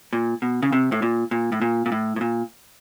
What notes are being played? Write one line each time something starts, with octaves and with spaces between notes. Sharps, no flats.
A#2
B2
C#3
C3
A2
A#2
A#2
A2
A#2
A#2
A2
A2
A#2